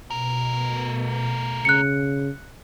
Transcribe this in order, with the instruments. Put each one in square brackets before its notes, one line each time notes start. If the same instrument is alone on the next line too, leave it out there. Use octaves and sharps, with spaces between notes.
[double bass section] B2 [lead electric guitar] A3 A#4
[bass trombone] C#3 [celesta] F#6 C#7